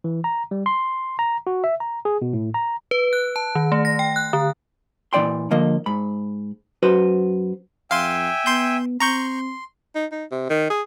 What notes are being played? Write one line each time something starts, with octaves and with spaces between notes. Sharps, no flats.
E3
A#5
G3
C6
A#5
F#4
E5
A#5
G#4
B2
A2
A#5
B4
F#6
A5
D#3
A3
A#6
G5
F#6
D3
A#2 E3 C4 D5 G5 C6
D3 F3 A#3 D#5
G#2 B5
F#2 F#4 B4 C5
F2 E5 F5 G5 G#5 C6
B3 C6 G6
C4 A#5 C6 C#6 G6
D#4
D#4
C3
D#3
G#4